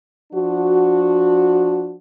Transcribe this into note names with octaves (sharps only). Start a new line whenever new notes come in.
F3 D4 F#4